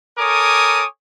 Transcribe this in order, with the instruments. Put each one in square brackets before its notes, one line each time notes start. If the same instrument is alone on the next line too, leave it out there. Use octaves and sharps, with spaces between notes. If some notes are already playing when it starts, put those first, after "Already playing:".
[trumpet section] A4 A#4 C#5 G#5 D6 D#6